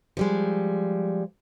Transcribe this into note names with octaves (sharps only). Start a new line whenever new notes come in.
F3 G3 G#3